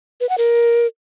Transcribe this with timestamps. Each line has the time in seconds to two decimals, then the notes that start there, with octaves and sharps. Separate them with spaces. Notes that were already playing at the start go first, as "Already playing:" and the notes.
0.21 B4
0.29 F#5
0.38 A#4